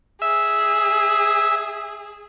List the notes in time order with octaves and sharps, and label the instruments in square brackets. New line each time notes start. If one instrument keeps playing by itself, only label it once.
[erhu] G#4 [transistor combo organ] E5